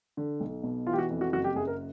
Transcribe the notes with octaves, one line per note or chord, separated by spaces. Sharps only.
D3
B1
B2
E3 F4
G4
F#4
F2
F#4
F#1 F#4
G4
F#2 G#4
A#4